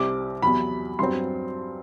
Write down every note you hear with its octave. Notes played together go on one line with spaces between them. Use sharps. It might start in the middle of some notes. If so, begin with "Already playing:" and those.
Already playing: C2 C3 G3 C4 D6
E2 C3 F#3 B5
G2 F#3 C4 C6